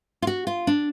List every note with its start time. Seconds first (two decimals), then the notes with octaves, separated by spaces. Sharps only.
0.22 F4
0.27 F#4
0.47 F4
0.67 D4